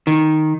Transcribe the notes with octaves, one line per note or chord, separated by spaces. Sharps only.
D#3